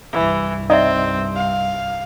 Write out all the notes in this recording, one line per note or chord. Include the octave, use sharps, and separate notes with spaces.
C2 G2 E3
C4 D#4 D5 E5
F5